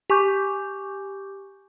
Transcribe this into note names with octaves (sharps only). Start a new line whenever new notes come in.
G4 G#5 C#6 D6 G6